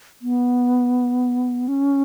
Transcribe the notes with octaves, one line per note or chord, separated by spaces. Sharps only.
B3
C#4